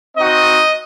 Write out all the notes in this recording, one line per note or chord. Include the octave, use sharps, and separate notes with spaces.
C4 D#4 F#4 D#5